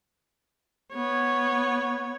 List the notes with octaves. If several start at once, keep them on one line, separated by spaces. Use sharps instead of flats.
B3 C#5